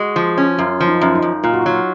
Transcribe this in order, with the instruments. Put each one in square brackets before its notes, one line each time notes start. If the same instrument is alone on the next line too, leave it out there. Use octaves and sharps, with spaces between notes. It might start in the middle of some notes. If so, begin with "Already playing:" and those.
Already playing: [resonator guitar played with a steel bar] G#3 [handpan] F#4
[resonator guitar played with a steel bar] F3
C#4
[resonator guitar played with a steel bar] F#2 [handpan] F4
[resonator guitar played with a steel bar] F3
[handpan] D#4
[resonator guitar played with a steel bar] F#2
[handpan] D#4
[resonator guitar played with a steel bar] F#2
[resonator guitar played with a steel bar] A#2 [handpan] F4
[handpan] F#4
[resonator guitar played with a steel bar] F#3 [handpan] F4